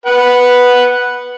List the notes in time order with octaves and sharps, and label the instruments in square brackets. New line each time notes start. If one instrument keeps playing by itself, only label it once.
[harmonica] B4 F#5